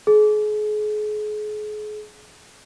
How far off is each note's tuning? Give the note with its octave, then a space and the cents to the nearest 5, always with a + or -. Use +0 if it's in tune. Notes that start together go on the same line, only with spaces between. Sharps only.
G#4 +35